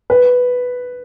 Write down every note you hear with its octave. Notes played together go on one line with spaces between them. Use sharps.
B4